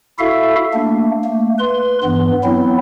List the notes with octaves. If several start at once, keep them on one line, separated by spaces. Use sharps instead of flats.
E4 F#4 A4 E5 F5
A3 A#3 D4
A3 A#3
B4 C6
G2 E3 B3
F#3 B3 C4 E4